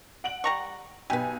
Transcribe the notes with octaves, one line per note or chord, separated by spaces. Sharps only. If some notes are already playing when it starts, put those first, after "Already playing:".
F#5 D7 F#7
G3 A#5 C#6
B1 G4 B4 G#5